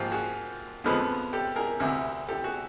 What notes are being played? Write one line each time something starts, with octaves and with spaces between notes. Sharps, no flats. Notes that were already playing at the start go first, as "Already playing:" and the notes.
Already playing: G#2 F3 A#3 F4 G4
F#4 G#4
F2 D3 F3 G#3 B3
G4 A4
G#4 A#4
D2 C3 E3
G4 A4
F#4 G#4